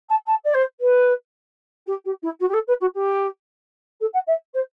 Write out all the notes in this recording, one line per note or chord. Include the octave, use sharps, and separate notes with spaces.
A5
A5
D5
C5
B4
G4
G4
E4
F#4
G4
A4
B4
F#4
G4
A4
F#5
E5
C5